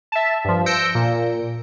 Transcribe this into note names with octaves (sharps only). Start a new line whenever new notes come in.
E5 A5
G2 F3
E6 G6 A#6 C#7 D7
A#2